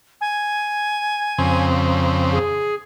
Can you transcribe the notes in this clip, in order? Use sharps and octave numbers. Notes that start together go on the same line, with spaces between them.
G#5
F2 C#3 C4
G#4